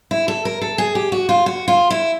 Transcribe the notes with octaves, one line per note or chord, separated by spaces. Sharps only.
E4
A4
A#4
A4
G#4
G4
F#4
F4
F#4
F4
E4